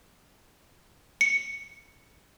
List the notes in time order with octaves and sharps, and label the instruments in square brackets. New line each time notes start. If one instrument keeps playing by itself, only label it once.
[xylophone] C#7